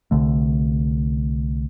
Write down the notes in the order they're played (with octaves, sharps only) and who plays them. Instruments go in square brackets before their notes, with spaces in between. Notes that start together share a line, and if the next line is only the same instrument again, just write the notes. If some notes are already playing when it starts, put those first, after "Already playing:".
[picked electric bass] C2 D3 A3